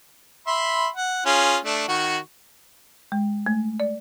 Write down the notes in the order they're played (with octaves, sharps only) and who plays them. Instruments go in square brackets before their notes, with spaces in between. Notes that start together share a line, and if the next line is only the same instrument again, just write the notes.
[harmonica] E5 B5 C6
F#5
C#4 F4 G#4
A3 D4
D#3 F#4 C#6
[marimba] G#3
A3
D5